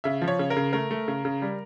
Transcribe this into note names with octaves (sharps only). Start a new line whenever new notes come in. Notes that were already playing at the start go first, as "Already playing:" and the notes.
C#3 E5
F3
C#5
C#3
A#4
C#3
A3 A#4
A3
C#3
C#3
G3